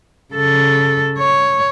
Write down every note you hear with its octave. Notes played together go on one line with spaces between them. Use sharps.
C#3 A4
C#5